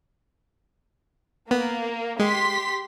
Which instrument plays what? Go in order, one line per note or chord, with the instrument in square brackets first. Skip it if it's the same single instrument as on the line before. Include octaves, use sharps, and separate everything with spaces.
[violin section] A#3 [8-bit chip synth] B3
[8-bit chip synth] G#3 [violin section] G4 C6 B6